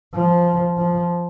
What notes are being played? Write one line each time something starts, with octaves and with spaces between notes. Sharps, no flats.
F3
F3